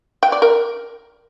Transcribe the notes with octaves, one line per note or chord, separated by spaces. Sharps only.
G5
D5
A#4